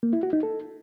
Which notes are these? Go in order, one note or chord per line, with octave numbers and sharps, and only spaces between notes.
A#3
E4
F#4
D#4
A4